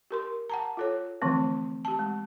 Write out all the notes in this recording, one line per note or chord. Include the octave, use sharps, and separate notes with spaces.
G4 A#4 C6
F#5 A5 A#5
F4 A4 C#5
D3 E3 F3 A3 C4
G4 A5
G#3